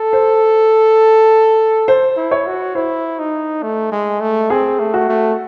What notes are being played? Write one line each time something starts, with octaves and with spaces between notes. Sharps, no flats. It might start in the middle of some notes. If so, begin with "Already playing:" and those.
Already playing: A4
C5
C5
E4
C#5
F#4
E4 C5
D#4
A3
G#3
A3
C4 G#4
A3
F#4
A3